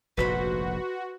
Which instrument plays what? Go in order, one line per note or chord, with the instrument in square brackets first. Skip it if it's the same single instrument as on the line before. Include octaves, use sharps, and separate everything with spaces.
[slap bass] F1 A#1 G#2 [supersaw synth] F#4 [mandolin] B4 C5 B5